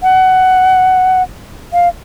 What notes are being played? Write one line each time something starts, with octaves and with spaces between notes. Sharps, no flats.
F#5
F5